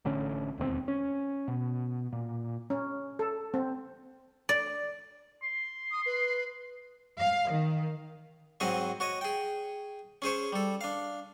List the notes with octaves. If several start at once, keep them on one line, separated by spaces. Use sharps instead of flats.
A1 D3 A3 C#4
E1 D#2 E3 C4
C#4
B2
A#2
C#4
A4
C4
D5
C6
D#6
B4
F5
D#3
G#2 F#3 C4 F#4 G#4 D#5
F#4 C#5 D#5
G#4 G5
C#4 G#4 C5 C#5
G3 A4
D4 F5